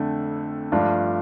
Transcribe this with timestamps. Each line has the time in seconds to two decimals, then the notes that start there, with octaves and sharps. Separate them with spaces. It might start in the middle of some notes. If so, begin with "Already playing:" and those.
Already playing: F2 D3 A3
0.72 G2 F3 A3 D4 F4